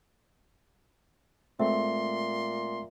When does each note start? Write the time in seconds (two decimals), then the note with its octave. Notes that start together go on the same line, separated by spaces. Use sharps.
1.60 A#2 G#3 A3 C4 E5 C6